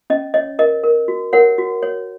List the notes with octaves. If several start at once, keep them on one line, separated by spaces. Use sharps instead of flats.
C#4 D#5
C#5 D#5
A#4 D#5
A#4
F#4
A#4 C#5 F#5
F#4
C#5